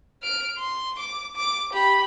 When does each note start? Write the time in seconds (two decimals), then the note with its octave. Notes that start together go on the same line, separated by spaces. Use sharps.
0.23 F6 D7
0.58 C6
0.99 D6
1.36 D6
1.73 G4 B5